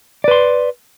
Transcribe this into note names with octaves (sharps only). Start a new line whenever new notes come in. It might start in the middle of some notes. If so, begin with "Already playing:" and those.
B4 D5 C6